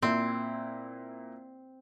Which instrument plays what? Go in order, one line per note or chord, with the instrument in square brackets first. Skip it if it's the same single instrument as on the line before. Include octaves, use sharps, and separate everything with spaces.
[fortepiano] A#2 E4 [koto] C4